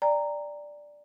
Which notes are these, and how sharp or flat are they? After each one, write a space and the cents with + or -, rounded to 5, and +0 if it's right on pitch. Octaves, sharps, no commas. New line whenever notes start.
D5 +0 G5 +35 A#5 -10